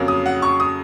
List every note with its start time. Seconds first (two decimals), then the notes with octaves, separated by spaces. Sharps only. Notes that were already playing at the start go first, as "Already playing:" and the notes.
Already playing: F2 C#3 F#3 A#3
0.08 D#6
0.26 F#5
0.42 C#6
0.60 D#6